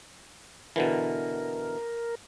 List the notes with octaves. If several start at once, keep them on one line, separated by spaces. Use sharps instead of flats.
B2 D3 E3 A#4